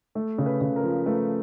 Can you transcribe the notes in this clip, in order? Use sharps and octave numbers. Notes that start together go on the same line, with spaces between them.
A3
C#3
B4
C#3
A#4
F3
A3 B4